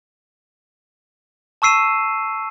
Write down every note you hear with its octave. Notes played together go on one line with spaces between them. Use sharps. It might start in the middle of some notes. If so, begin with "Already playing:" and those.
A5 C#6 E6 C7 D#7 E7